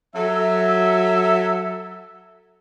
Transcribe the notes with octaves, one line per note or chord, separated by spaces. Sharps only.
F#3 A4 E5